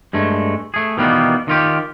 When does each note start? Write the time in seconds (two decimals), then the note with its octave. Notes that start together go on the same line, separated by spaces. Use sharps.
0.13 G2 G#3 A3
0.74 A3 G#4
0.97 B2 D#3 E3 G3 A#3 B3
1.48 D#3 F4 G4